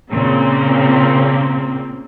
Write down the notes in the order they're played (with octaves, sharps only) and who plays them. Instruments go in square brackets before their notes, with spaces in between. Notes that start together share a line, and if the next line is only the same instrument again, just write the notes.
[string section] A#2 C#3 A#3 C4